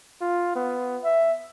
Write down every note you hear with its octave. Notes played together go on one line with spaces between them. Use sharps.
F4
B3
E5